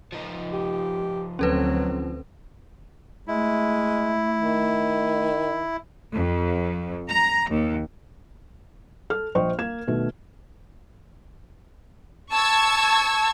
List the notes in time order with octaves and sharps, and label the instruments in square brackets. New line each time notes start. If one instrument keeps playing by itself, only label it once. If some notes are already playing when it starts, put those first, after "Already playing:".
[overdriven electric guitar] F3 D#4
[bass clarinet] G4
[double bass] D2 C4 [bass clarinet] F#3 [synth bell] C#4 A4 B4
[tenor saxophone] G#3 [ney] A3 [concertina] E4
[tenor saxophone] D#3
[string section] F2
A#5
D#2
[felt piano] A4 F6
A#1 C5 D#5 G5 C#6
A#3 F5 G#6 E7
B2 D#3 A3
[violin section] A5 C#6 E6 G#6